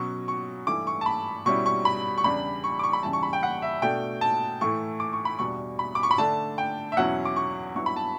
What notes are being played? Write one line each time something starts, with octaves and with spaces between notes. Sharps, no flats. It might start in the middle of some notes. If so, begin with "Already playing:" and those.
Already playing: B2 F#3 C#4 C#6
C#6
G2 E3 A3 E4 D6
C#6
A5
B5
B2 G3 C#4 E4 C#6
C#6
B5
C#6
E2 C#3 G3 D4 B5
C#6
D6
C#6
B5
E2 C#3 E3 G3 A5
C#6
B5
G5
F#5
E5
B2 A3 D4 G5
A5
A2 E3 A3 E4 C#6
D6
C#6
B5
E2 B2 G3 D4 C#6
B5
D6
C#6
B5
D3 A3 D4 A5
G5
E5
E2 B2 F#3 C#4 E4 F#5
D6
C#6
G2 F#3 B3 E4 C#6
B5
A5